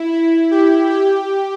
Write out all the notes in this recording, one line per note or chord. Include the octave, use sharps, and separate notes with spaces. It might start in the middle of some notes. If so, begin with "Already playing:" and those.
Already playing: E4
E4
G4
G4